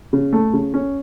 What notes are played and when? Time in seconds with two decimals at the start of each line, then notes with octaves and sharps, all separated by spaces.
0.13 C#3
0.33 A3
0.53 C#3
0.74 C#4